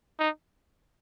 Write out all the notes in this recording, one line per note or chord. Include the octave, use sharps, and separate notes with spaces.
D#4